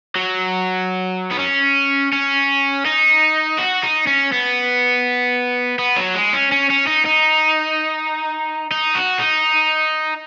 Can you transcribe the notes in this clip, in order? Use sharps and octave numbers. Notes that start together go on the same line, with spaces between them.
F#3
B3
C#4
C#4
D#4
F#4
D#4
C#4
B3
B3
F#3
G#3
C#4
C#4
C#4
D#4
D#4
D#4
F#4
D#4